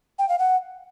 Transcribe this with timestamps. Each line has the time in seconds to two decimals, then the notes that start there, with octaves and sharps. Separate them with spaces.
0.19 G5
0.29 F5
0.39 F#5